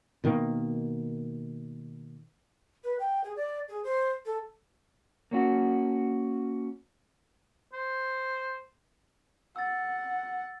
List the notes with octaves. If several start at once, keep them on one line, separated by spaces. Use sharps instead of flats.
B2 D#3 A#3
B4
G5
G#4
D5
G#4
C5
A4
A#3 C#4 F#4
C5
F#5 E6 A6